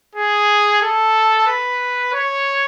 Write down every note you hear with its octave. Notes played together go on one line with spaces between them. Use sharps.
G#4
A4
B4
C#5